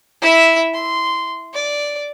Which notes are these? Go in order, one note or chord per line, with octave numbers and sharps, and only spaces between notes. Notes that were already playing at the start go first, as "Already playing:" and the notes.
E4 E5
C6
D5